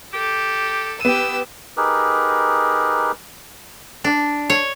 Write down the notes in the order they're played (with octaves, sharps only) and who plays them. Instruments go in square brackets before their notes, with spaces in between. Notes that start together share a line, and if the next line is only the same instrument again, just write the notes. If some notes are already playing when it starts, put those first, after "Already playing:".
[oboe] G4 [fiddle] A4
[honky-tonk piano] B3 D#7 [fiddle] G4 E6
[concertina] D#4 G4 G#4 A#4 B4
[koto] D4
C#5